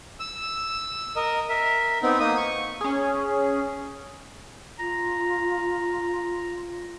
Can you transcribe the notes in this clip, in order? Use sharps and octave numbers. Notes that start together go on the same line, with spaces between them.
E6
A#4 D#5
A#4 E5
B3 C4 D#4
A#3 D#4 D#6
C#6
C#4 G#4
F4 A#5